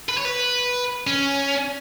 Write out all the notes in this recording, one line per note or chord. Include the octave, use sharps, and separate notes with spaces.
B4
C#5
B4
C#4